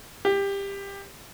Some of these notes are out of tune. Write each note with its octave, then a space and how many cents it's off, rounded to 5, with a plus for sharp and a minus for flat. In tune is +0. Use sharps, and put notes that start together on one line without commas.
G4 +20